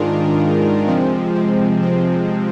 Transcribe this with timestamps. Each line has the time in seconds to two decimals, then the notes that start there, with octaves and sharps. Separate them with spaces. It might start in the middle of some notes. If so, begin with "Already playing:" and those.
Already playing: G#2 D#3 G#3 D4 F4 A#4
0.87 C3 F3 G#3 C4
1.35 C4
1.82 C4